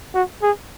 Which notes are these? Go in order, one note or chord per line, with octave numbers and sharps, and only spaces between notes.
F#4
G#4